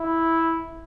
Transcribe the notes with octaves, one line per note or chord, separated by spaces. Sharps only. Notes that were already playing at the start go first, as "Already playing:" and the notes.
Already playing: E4